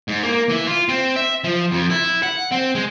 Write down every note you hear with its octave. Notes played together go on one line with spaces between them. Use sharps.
G#2
A#3
E3
F4
C4
E5
F3
F2
E4
F#5
C4
G#3